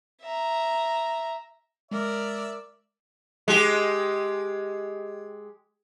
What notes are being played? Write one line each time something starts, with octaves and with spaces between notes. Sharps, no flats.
E5 A#5
G#3 A#4 D5 E5
G#3 G4